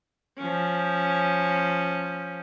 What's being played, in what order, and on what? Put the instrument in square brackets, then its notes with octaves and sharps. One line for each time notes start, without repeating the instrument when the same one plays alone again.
[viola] F3 C#4